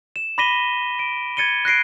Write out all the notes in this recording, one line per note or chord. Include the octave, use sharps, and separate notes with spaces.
E7
B5 D6 A#6 B6 D#7 G7
D7
G#6 A6 C#7 D#7 G7
F#6 A#6 C7 D7